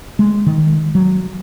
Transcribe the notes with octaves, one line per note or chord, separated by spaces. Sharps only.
G#3
D#3
F#3